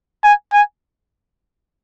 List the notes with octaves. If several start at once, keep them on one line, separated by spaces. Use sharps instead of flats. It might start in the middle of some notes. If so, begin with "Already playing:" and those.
G#5
G#5